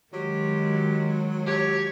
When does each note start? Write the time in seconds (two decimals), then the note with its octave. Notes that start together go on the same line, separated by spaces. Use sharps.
0.13 D#3 F#3 G#3 G4
1.46 G4 C#5